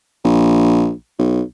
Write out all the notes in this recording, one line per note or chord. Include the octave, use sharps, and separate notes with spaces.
A#1
B1